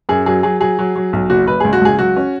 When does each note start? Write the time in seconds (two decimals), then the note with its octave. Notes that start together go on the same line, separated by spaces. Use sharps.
0.09 F#2 G#4
0.26 F#3 G#4
0.43 F#3 G#4
0.60 F#3 G#4
0.79 F#3
0.96 F#3
1.13 B1
1.30 F#1 F#4
1.47 F#1 B4
1.60 C#2 G#4
1.73 F#4
1.81 C#2 G#4
1.99 F#3 F#4
2.16 C#4